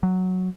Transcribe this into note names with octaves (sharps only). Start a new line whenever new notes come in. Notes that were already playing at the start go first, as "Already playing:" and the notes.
F#3